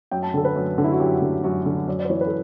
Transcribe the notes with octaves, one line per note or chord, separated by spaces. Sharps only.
F#2 G5
A5
D3 A4
B4
F#2
D3
E4
F#4
F#2 G4
D3
F#2 F#4
D3
F#2 D5
D5
B4
E3 C#5
B4
A4